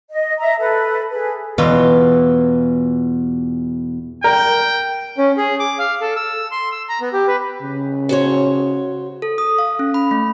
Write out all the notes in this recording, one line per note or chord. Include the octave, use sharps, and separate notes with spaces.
D#5
E5 A#5
A4 B4
G#4 B4
E2 B2 E3 F4 F5 B5
A#4 G5
C#4
G#4
D6
F5
A4
E6
C6
E6
A#5
B3
G4
B4
C#3
F#4 C5 C#5
A4
D#6
F5
C#4
B5
A3